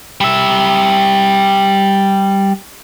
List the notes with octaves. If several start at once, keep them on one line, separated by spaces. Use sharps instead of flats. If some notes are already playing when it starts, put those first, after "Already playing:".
G3 E5